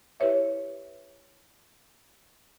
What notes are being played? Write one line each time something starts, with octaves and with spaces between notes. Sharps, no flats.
E4 G4 B4 C#5 E5